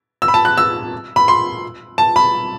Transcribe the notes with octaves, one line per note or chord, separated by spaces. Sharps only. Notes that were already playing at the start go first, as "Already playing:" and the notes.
E6
B5
A5
F#6
E6
B5
C6
A5
B5